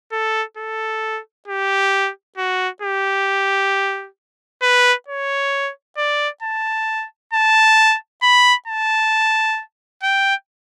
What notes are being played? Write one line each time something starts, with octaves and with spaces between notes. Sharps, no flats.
A4
A4
G4
F#4
G4
B4
C#5
D5
A5
A5
B5
A5
G5